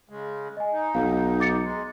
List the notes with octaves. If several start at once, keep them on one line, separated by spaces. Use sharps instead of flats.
C#3 G#3
D#5 G#5
D#4
B1 F5
D6 A6 C#7
G#3